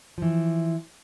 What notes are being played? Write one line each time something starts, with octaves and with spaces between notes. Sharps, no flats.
E3 F3